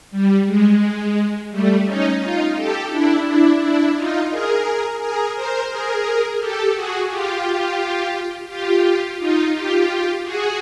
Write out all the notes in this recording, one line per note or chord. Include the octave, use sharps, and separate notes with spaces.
G3
G#3
G3 A3
C#4 D#4
D#4 F4
G4 A4
D4 E4
D4 E4
D4 E4
D#4 F4
G#4 A#4
G#4 A#4
A#4 C5
G#4 A#4
G4 A4
F#4 G#4
F4 G4
F4 G4
D#4 F4
F4 G4
F#4 G#4